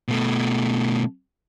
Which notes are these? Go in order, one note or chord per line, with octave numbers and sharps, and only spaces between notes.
B2 A3